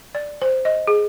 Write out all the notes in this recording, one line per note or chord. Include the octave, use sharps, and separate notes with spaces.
D5
C5
D#5
G#4